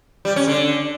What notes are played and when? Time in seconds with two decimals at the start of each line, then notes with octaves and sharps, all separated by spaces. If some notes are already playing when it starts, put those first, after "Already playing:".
0.25 G3
0.36 C#4
0.48 D3